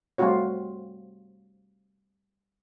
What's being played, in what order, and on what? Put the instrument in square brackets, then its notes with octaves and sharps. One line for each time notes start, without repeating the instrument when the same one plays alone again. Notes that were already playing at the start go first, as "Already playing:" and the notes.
[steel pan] G3 A3 C4 F4 F#4 C#5